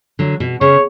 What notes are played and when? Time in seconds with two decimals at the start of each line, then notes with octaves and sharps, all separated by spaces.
0.19 D3 F#3
0.40 B2
0.61 C#3 C#5